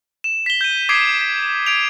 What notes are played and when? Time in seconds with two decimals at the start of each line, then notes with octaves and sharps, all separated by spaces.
0.24 E7
0.46 B6 G7
0.61 G6 D#7
0.89 D6 D#6 G#6 B6 C7 D7
1.21 B6
1.66 G#6 D7 F7